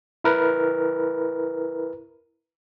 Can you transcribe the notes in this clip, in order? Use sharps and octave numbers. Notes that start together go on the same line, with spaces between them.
E4 A#4 B4